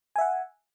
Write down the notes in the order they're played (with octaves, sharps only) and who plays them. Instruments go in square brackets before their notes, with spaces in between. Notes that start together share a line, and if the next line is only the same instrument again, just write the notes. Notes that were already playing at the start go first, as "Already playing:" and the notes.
[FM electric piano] G#5
E5
F#5